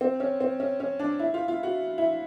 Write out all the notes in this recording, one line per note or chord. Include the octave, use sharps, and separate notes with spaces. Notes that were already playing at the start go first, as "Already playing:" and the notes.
C4
C#4
C4
C#4
C#4
D4
E4
F4
F4
F#4
E4